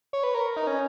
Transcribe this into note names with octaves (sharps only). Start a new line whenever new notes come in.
C#5
B4
A#4
D#4
C#4